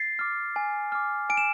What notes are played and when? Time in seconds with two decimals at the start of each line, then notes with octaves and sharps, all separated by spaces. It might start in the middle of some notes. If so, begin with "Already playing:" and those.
Already playing: A6 C7
0.19 D6 F6
0.56 G#5
0.92 D6 F6
1.30 G#5 D7
1.37 E7